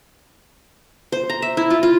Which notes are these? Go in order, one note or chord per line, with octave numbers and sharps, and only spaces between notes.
C5
A#5
E5
E4
F4
F4